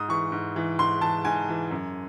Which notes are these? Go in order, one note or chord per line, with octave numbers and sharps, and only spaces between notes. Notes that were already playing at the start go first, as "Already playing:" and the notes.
Already playing: G#2 D#6
E3 C#6
G#2
E3
G#2 C6
E3 A5
G#2 G#5
E3
F#2